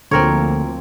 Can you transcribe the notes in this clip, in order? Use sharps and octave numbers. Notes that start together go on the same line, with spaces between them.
D2 D3 F3 A#3 C4 A#4 C#5